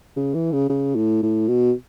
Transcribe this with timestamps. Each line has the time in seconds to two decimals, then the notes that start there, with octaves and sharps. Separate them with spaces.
0.16 C#3
0.34 E3
0.52 C#3
0.69 C#3
0.96 A2
1.23 A2
1.48 B2